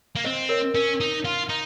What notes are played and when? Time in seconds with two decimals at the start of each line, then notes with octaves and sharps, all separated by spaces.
0.15 A#3
0.24 C4 C5 D#5
0.49 A#4 C#5
0.74 C#4 A#4
1.00 D#4
1.25 F4
1.49 D#4